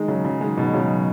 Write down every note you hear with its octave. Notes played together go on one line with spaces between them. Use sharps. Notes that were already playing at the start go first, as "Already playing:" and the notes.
Already playing: D#3 G#3
C#3 F#3
C#3 F#3
D#3 G#3
B2 D#3
C#3 F#3